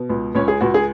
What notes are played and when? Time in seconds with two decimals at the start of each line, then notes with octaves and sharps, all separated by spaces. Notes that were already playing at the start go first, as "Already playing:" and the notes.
Already playing: B2
0.10 C#2
0.35 C#2 C#4 C#5
0.48 G#4
0.61 C#2 F#4
0.74 G#4